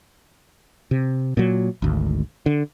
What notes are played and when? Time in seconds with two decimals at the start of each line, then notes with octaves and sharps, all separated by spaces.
0.91 C3
1.37 A#2 F#3
1.82 G#1 D2
2.46 D3